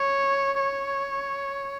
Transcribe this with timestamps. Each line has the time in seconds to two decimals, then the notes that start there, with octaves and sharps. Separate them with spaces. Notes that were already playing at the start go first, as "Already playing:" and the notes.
Already playing: C#5
0.59 C#5